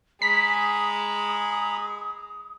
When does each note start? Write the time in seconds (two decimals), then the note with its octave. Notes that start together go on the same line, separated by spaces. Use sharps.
0.22 G#3 G#4 A#5 B5 D#6 B6